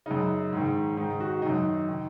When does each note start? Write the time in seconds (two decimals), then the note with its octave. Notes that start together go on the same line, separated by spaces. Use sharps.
0.06 F#2 C#3 D#4
0.52 G#2 D#3
0.97 G#2 D#3 D#4
1.20 F#4
1.42 F#2 D#3 D#4
1.88 D#3